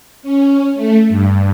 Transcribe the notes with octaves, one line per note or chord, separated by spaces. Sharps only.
C#4
A3
G2